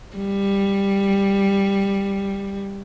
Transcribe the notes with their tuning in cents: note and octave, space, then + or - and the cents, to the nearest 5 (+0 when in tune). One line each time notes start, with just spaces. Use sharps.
G3 +10